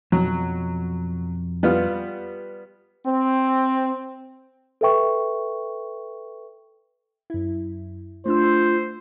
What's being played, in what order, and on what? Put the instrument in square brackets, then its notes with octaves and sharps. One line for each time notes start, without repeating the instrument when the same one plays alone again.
[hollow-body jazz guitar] F2 B2 [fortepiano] F#3
[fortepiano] G3 B3 F4
[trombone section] C4
[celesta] A4 B4 E5 G5 C#6
[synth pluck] F#2 E4
[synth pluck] A3 D4 E6 [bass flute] F4 [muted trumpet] C5